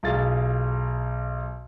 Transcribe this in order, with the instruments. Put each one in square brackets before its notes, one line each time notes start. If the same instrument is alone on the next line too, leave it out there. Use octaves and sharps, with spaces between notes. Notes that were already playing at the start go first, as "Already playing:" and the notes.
[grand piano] B1 F4 G#4 A6